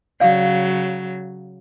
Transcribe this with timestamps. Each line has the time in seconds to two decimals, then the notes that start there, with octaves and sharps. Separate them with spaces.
0.20 C#3 F#3 D5 F5 D#6